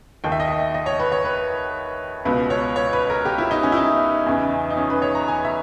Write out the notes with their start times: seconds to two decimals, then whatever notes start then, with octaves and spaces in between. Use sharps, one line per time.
0.24 D#2 D#3 G5
0.32 E5
0.40 D#5
0.48 E5
0.74 D#5
0.86 C#5
1.00 B4
1.12 C#5
1.25 B4
2.25 C#2 B2 B4
2.50 C#5
2.76 C#5
2.93 B4
3.10 A#4
3.25 G4
3.38 E4
3.51 D#4
3.63 C#4
3.72 E4
3.77 D#4
4.26 E2 C#3 E3
4.70 D#4
4.77 C#4
4.90 B4
5.02 C#5
5.15 A#5
5.28 G#5
5.45 E5